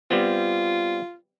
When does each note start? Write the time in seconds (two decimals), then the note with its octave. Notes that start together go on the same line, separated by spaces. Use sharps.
0.11 G3 B3 C4 F4